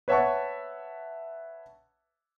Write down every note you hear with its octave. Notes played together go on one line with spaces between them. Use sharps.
B4 C#5 E5 F#5 A5 C#6